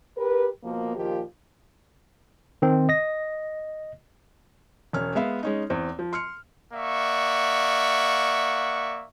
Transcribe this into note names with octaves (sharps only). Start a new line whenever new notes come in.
G4 A#4 B4
B2 F3 A#3
A#2 D#3 F3 F4 G4
D#3 C4
D#5 A#6
E1 C#4 F6
G#3 B3 E5 F5
G#3 C#4 D#4
E2 C4
F3
C6 F6 C#7
A#3 D5 E5 F#5 C#6